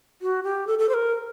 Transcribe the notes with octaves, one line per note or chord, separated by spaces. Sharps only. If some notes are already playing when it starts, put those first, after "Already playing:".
F#4
G4
A4
A4
C5
A#4